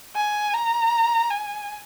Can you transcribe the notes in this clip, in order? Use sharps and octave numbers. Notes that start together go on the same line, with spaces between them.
G#5
A#5
G#5